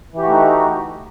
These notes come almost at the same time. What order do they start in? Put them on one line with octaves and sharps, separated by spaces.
E3 G4 F#4 A3 D#4